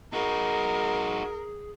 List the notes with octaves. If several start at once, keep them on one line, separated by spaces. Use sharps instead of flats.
D#4 F#4 G#4 A#4